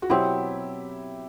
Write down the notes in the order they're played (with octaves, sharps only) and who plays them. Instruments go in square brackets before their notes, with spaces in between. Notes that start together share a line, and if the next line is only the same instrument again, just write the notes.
[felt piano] F#4
[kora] B2 F#3 C4 [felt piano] E4 G4